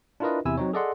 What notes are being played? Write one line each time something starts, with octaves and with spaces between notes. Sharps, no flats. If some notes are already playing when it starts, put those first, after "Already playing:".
D4 E4 F4 A#4 B4 D#5
E2 C3 E4 G#5 E6
F#3 C4 D#4 C#5
G#4 A4 D5 D#5 F#5 C6